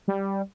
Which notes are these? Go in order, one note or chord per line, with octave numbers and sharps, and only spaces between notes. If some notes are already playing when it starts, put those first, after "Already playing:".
G3